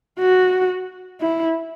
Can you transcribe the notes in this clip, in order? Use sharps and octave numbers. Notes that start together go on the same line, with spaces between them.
F#4
E4